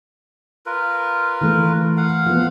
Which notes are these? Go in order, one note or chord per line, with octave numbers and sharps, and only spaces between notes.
F4 A#4 B4
E3 A3
F5 F#5
F3 B3